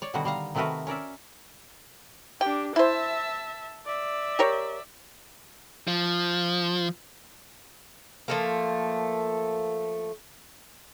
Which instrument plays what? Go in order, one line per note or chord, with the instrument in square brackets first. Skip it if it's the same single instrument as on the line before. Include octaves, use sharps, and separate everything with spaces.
[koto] C#5 D5
B2 D3 D#3 G3 F#4 F#5
G3 F5 A#5
C3 D#3 A3 F#4 A#4 B4
C#4 A#4 D5 E5
[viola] D4 G4 [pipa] G5
[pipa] E4 C5 [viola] E5 A5
[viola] D5 E5
[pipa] G4 A#4 C#5
[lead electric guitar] F3
[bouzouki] F3 A3 A#3